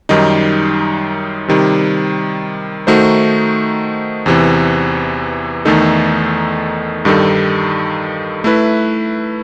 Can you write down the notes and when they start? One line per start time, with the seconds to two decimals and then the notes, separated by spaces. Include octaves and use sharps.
0.09 F#2 D#3 G3 D#4
1.48 C3 D#3 G3
2.87 D#3 A3 D#4 F#4 C5
4.26 E2 C3 E3
5.65 E2 D#3 A3 D#4 A4
7.05 G2 D#3 G3 D#4 A4
8.44 A3 E4 B4